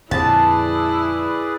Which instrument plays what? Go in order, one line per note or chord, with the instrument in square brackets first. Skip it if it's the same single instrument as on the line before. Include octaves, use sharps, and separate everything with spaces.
[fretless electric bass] F2 A#2 D3 [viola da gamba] E4 [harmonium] G#4 B4 D5 [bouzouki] A5